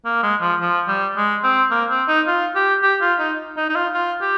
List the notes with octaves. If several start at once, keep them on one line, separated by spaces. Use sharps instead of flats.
A#3
G#3
F3
F3
G3
G#3
C4
A#3
C4
D#4
F4
G4
G4
F4
D#4
D#4
D#4
F4
F4
G4